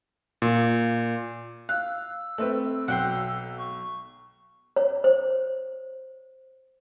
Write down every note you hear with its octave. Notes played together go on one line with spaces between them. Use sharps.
A#2
F5 E6 F#6
A3 C4 A4 B4
B1 F#5 G5 C6
C#6
C#5
C5